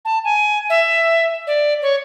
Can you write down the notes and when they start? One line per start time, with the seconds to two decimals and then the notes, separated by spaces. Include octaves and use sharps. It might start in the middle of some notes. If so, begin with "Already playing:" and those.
0.05 A5
0.24 G#5
0.70 E5
1.47 D5
1.82 C#5